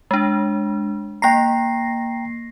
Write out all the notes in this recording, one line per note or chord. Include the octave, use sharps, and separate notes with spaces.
G#3 D4
A#3 G5 A#5 A#6 C7